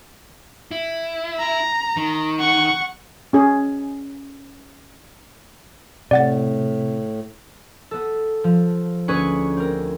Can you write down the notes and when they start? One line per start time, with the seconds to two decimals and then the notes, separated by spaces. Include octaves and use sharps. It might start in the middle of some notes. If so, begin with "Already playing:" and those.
0.71 E4
1.39 A#5
1.97 D#3
2.39 F#5 C#6
3.33 C#4 G#4
6.11 A2 C3 D5 F#5 A6
7.91 B3 A4
8.44 F3
9.08 D2 C#4 G#4 B4 C#6
9.57 C4 A#4